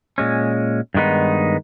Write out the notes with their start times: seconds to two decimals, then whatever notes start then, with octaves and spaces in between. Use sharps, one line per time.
0.18 A#2 G#3 C#4
0.94 G2 D#3 G#3 B3 D#4